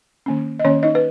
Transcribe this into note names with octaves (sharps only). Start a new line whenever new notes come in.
D#3 A#3 C#4
D#5
D#3 A#3 C#4 C#5
D#4 D#5
B4